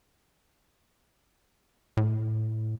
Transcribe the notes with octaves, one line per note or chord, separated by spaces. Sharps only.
A2